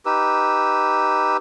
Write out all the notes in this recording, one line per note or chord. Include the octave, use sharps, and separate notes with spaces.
D#4 G4 B4 E6